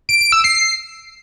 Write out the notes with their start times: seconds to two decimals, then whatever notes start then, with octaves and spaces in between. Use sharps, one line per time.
0.09 D7
0.21 D7
0.32 E6
0.44 C7